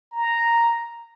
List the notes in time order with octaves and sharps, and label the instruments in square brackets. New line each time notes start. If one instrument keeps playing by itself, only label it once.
[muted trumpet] A#5